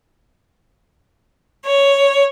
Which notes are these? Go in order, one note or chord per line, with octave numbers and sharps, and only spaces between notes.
C#5